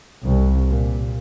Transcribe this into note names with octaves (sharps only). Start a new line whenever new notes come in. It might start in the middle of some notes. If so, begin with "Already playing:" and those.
C2
A#2